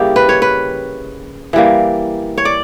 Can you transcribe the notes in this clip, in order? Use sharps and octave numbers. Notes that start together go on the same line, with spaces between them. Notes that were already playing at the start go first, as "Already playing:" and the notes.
Already playing: C#3 G3 A#3 E4 G4
B4
C#5
B4
E3 G3 A#3
C#5
D5